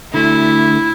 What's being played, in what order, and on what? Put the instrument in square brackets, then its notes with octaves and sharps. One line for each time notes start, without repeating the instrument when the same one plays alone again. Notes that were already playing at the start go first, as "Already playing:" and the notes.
[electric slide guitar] D3 A3 [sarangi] E4